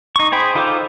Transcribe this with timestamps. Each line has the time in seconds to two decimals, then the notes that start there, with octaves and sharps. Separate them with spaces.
0.16 D#4 C#6
0.32 G#4 C5 G5 B5
0.55 D#4 F4 A4 C5 D6